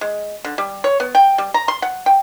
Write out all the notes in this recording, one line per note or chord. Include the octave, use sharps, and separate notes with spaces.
G#3
D3
G3
C#5
B3
G5
G3
A#5
C6
F#5
G5